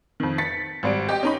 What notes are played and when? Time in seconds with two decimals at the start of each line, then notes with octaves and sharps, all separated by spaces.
0.20 F2 D#3
0.38 A6 B6 C#7
0.83 G#1 G3 D7
1.09 G4 D#5 G5
1.23 C#4 D#4 B5